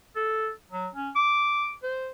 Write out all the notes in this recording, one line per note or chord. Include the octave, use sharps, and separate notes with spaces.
A4
F#3
C#4
D6
C5